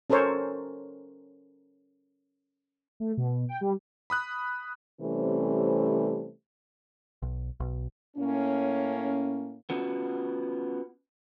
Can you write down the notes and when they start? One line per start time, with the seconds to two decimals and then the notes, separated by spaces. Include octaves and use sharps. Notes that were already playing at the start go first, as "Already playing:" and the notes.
0.10 C#4 A4 A#4 C5 C#5
3.00 A3
3.17 B2
3.49 G5
3.61 G3
4.10 B5 D#6 F#6
5.01 C3 E3 G3 A3 C4 C#4
7.22 B1
7.60 B1
8.17 A2 A#3 C#4
9.70 B3 C#4 F4 F#4